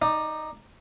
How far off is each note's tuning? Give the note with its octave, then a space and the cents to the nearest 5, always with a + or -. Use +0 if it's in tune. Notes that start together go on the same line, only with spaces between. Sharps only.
D#4 +0 D5 +20